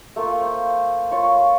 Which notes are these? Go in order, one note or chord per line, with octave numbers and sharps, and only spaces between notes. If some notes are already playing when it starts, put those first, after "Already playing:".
A3 A#3 F4
C5
F4 C#5 A#5 C#6